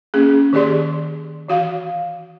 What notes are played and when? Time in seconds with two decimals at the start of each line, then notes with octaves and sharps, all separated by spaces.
0.14 A#3 C#4 G#4
0.53 D#3 G4 G#4 D5 C6
1.48 E3 F#4 F5